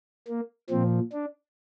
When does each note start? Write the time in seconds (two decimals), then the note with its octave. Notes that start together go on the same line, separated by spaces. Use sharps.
0.28 A#3
0.70 A#2 F3 C4
1.12 D4